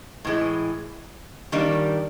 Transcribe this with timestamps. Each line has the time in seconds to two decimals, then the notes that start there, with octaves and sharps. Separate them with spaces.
0.25 A2 E3 G#3
1.52 D#3 G3 A#3 D4